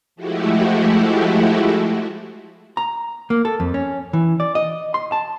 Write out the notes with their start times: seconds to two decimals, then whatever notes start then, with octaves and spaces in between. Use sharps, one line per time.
0.16 F3 G#3 A3 E4 F#4 G4
2.77 A#5
3.30 A#3
3.45 A4
3.60 F2
3.74 C#4
4.13 E3
4.40 D5
4.55 D#5
4.94 C6
5.12 A5